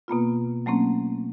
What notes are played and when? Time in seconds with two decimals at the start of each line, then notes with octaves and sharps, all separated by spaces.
0.08 B2 A#3 B3 F4
0.66 F#3 A3 A#3 C4 C#4